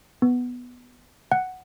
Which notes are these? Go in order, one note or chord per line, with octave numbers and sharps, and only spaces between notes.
B3
F#5